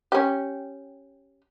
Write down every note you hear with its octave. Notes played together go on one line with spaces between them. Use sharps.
C#4 G4